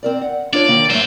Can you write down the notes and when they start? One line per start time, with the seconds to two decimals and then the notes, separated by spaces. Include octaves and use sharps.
0.03 C4 A#4 D5
0.21 F#5
0.53 D4 F4 C#5 D5
0.68 D3 D#3 A#3
0.90 G#2 F#3 A3 C5